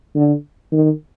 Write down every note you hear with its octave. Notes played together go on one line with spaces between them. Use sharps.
D3
D#3